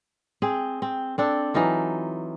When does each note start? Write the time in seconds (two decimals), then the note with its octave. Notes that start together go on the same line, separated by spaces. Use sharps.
0.42 C4 G#4
0.82 C4
1.18 C4 D4 A4
1.54 E3 F#3 D#4 F4